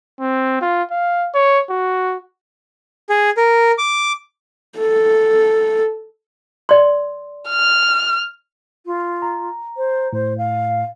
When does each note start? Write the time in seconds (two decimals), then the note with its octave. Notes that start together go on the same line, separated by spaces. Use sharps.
0.20 C4
0.62 F4
0.91 F5
1.34 C#5
1.70 F#4
3.09 G#4
3.37 A#4
3.78 D6
4.78 A4
6.69 D5 C6
7.49 F6
8.86 F4
9.22 A#5
9.77 C5
10.13 A2 C5
10.38 F5